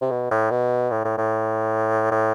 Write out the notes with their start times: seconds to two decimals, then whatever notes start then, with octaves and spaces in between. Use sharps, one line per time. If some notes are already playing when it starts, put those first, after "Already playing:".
0.01 C3
0.11 B2
0.31 A2
0.51 B2
0.91 A2
1.05 A2
1.17 A2
2.11 A2